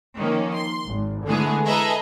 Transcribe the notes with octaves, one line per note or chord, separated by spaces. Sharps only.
D#3 F3 A#3 C#4
C6
G#1
D3 E3 G#3 A3 B3 G#4
G#4 A4 B4 D#5 E5 A#5